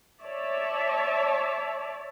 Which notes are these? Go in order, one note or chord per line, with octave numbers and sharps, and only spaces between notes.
C#5 D5 E5 A5